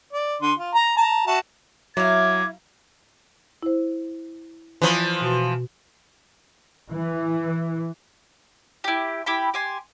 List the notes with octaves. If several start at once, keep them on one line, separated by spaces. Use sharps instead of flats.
D5
D3 C6
F4
A#5
A5 A#5
F#4 E5 A5
F#3 E4 F5 D6 G#6
E4 C5
E3 F3
B2 F#4
E3
E4 G4
E4 G4 G5 B5
G4 G#5 C6